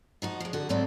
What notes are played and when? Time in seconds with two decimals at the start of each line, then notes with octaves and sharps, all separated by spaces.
0.22 F3 D#4 F#4
0.40 F3 G#3
0.53 D3 F#4
0.69 G#2 F#3 A3 C4 D5